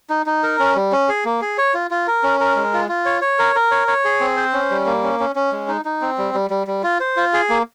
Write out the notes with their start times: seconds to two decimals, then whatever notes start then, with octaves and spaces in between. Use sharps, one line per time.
0.10 D#4
0.26 D#4
0.43 A#4
0.59 C#4
0.75 G3
0.92 C#4
1.09 G#4
1.25 A#3
1.41 G#4
1.58 C#5
1.74 F4
1.91 F4
2.07 A#4
2.23 C#4
2.40 A#4
2.56 G#3
2.73 F4
2.89 F4
3.06 C#5
3.22 C#5
3.39 A#4
3.55 A#4
3.71 C#5
3.88 C#5
4.05 G#4
4.20 C4
4.37 C5
4.53 C#4
4.70 G3
4.86 A#3
5.03 C#4
5.20 C#4
5.36 C#4
5.52 G#3
5.68 D#4
5.85 D#4
6.01 C4
6.18 G3
6.34 G3
6.50 G3
6.67 G3
6.83 F4
7.00 C5
7.16 F4
7.33 G#4
7.49 A#3